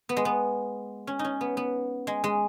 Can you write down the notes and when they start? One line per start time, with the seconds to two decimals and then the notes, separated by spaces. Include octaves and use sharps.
0.09 B3
0.17 G#3
0.25 B3
1.07 C#4
1.19 D#4
1.24 C#4
1.41 B3
1.57 B3
2.07 G#3
2.24 G#3